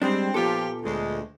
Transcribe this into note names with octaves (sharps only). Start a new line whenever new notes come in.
G3 G#3 C4 D4
A#2 F3 B3 F4 G4 A4
D2 G#3